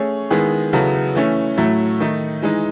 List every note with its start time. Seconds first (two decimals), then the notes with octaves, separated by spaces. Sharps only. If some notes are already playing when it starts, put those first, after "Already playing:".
Already playing: A3 C#4 G#4 C#5
0.30 D#3 G#3 B3 E4 G#4
0.73 C#3 F#3 B3 E4 A4
1.15 E3 A3 C#4
1.58 A2 F#3 A3 E4
2.00 D#3 A3 D#4
2.42 E3 G#3 D#4